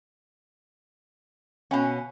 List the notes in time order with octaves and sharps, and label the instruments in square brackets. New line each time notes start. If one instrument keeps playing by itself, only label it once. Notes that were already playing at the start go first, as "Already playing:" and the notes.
[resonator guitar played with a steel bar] B2 C#4 [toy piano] F5 G#5 B5